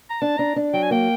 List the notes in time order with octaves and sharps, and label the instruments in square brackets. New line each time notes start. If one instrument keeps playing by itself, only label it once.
[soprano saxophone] A#5
[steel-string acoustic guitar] D4 [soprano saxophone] A5
[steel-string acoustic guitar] D4 [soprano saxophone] A#5
[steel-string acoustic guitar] D4
[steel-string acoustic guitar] F#3 [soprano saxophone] G5
[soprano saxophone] G#5
[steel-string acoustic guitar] A#3 [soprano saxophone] G5